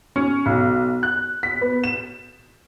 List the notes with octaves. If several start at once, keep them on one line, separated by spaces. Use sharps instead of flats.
C#4
B1
F#6
B6
B3
E7